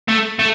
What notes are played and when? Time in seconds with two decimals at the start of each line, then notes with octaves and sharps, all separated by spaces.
0.09 A3
0.39 A3